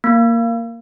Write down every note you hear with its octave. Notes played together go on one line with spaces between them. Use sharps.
A#3